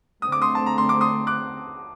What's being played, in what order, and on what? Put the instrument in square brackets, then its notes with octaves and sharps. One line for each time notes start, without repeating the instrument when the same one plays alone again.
[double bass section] D3 A3 C4 [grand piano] D#6
[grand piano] D6
C6 D#6
A5
A#5
C6
D6
C6 D#6
D6 F#6